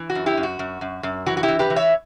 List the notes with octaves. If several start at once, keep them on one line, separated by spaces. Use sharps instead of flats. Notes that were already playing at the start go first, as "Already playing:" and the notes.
Already playing: E3
F#4
F#2
E4 G4
F#2
F#4
F#2
F#2
F#2
E3 F#4
F#4
E4 G4
E3
G4 B4
E3
C#5 E5